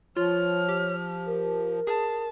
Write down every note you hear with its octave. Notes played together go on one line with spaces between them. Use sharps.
F3 F4 C#5 F6
G4
A#4
G#4 A5